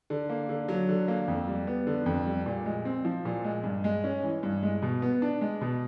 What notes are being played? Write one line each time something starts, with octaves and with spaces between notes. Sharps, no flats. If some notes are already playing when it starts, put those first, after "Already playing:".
D3
A#3
D3
F#3
D3
A#3
F2
G3
B3
D3
F2
G3
A#2
G#3
C4
F3
A#2
G#3
G2
G#3
C#4
E3
G2
G#3
B2
B3
D4
G#3
B2